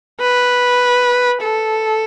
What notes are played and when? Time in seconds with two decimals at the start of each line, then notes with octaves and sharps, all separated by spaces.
0.21 B4
1.43 A4